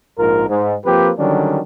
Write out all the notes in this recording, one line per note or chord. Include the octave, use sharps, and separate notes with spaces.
A#1 G#2 F4 A#4
G#2
F3 A#3 C4 F4 G4 B4
D3 D#3 F#3 G3 C#4 D4